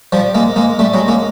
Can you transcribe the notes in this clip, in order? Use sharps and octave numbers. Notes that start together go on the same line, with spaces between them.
F3 G3
G#3 A#3
G#3 A#3
G3 A3
F#3 G#3
G#3 A#3